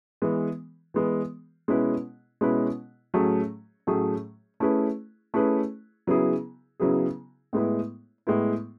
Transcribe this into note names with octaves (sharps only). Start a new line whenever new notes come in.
E3 G#3 B3
E3 G#3 B3
B2 G#3 C#4 E4 B4
B2 G#3 C#4 E4 B4
A2 F#3 A3 C#4 G#4
A2 F#3 A3 C#4 G#4
A3 C#4 E4 G#4 B4
A3 C#4 E4 G#4 B4
C#3 F#3 B3 E4 G#4
C#3 F#3 B3 E4 G#4
A2 G#3 B3 E4
A2 G#3 B3 E4